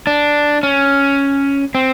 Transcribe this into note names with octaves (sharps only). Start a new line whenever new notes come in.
D4
C#4
C4